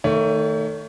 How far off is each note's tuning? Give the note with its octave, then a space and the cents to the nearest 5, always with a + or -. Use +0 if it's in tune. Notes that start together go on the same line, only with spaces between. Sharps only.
D#3 -5 A3 +20 C#5 +35